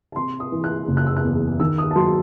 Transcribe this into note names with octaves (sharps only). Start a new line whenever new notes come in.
A5
C3 C6
D#6
E3
F#6
F#1
F#6
E6
F#6
E2
D#3 E6
D#6
A5
F#3 C6